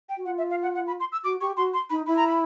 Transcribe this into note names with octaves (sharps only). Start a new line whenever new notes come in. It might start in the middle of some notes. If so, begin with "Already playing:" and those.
G5
F#4
F4 F#5
E5
F5
F#5
F#5
B5
C6
E6
F#4 D6
G4 C#6
F#4 C6
C6
D#4 B5
E4 B5
A#5
B5